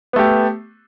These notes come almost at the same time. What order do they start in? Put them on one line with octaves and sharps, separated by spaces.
B3 A3 G4